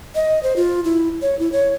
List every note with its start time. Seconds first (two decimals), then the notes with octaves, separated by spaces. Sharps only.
0.15 D#5
0.43 C5
0.56 F4
0.84 E4
1.22 C#5
1.39 E4
1.52 C#5